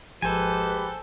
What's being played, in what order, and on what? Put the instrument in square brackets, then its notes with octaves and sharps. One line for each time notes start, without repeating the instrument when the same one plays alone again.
[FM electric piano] G#1 F3 [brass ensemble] G#3 G4 B4 [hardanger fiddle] A4 [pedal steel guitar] C5 G#5